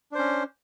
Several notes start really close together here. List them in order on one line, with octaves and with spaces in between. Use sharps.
D4 C5 C#4